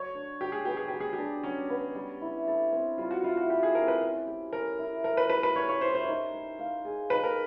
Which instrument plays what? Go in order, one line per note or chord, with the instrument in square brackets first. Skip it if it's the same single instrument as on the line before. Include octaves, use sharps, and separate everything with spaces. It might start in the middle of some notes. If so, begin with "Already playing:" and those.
Already playing: [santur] F#3 [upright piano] C#5
[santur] D4
[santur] F#3 [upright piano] G4
[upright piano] G#4
[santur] B3 [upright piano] G4
[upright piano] G#4
[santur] F#3 [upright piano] G4
[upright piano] G#4
G4
[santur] D4
[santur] F#3 [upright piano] C#4
[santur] B3
G3
E4
A4
C4
[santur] G3 [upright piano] F4
[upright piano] F#4
[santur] E4 [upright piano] F4
[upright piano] F#4
[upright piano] G4 [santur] A4
[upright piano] G#4
[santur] C4 [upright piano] A#4
[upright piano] B4
[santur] C#4
G4
[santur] C#4 [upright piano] A#4
[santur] E4
[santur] C#4 [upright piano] A#4
[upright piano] B4
[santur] G4 [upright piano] B4
[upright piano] B4
[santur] C#4 [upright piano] C#5
[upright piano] C#5
[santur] E4 [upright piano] C5
[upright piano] C5
[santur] D#4
C#5
F5
G#4
[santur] D#4 [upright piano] B4
[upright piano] A#4